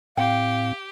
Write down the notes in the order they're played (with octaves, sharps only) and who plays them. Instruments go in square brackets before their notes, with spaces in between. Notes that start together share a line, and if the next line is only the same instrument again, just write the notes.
[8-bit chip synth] A2 C4 [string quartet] G4 [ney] F5 [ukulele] G5